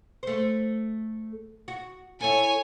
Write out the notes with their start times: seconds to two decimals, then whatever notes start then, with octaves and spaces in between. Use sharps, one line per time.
0.23 A3 C5
1.68 F#4
2.20 E4 A4 C#5 G#5